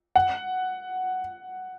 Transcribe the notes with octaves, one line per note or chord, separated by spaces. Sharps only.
F#5